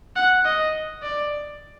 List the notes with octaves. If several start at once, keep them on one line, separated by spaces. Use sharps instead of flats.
F#5
D#5
D5